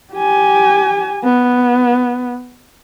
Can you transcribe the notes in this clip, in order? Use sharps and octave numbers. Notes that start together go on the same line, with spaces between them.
G4 G#5
B3